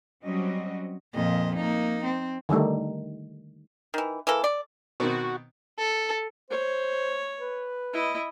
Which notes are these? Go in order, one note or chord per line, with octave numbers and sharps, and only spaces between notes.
F#3 G3 C4 C#4 F#4 D#5
F2 A#2 D#5
A#3 D#4
C4
D3 D#3 G3 A3
D#3 E3
E3 A#3 A4
D5
B2 D#3 C4 F#4
A4
C5 C#5
B4
E4 D#5